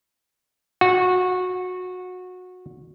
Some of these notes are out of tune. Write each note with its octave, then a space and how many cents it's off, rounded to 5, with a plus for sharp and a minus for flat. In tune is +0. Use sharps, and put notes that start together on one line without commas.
F#4 -20